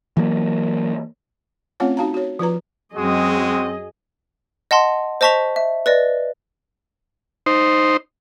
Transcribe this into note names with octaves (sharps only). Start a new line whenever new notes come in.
E3 F#3 A#3
A3 C4 C#4 F4 C#5 F#5
D#4 F#4 F5 A5 A#5
F#4 C#5
F3 F4 B4 A#5
F#2 F#3 G#3 C4 F#4 G#4 D#5 D#6
D#5 F#5 A5 C6
C5 D#5 A5 C#6 B6 F7
E5
B4 D5 D#5
D#4 C5